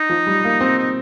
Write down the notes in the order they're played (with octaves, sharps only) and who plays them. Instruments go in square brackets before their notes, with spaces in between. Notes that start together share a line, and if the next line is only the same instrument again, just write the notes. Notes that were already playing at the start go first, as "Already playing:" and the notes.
Already playing: [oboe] D#4
[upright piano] F3
G3
A#3
C4
[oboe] D#4